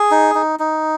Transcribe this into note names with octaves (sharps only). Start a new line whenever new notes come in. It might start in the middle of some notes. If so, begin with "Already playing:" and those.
Already playing: G#4
D#4
D#4
D#4